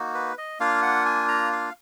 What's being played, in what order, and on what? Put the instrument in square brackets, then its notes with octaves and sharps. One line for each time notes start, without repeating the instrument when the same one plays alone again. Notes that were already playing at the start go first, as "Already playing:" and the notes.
Already playing: [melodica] A#3 D#4 F#4
B4
D#5
A#3 D4 F4 F5
F#5
G#5
A#5
F5